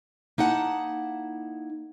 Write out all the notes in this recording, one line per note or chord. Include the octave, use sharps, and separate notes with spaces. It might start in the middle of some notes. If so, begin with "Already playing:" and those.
A#3 D#4 E4 F#5 A5